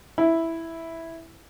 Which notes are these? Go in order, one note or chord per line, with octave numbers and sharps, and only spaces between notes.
E4